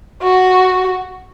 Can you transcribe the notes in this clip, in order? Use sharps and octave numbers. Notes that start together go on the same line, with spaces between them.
F#4